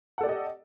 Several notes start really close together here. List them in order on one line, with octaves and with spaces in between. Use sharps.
F#5 A4 D5 G4 D#5